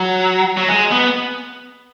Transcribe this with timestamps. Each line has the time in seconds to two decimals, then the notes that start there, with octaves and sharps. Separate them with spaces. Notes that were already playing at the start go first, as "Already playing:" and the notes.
Already playing: F#3
0.57 F#3
0.69 G#3
0.92 B3